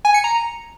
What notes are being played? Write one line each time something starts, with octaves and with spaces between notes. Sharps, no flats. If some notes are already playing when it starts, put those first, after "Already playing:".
G#5
C#7
A#5